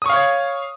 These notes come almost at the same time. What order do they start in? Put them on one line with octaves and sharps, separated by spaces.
D#6 C#6 F5 C#5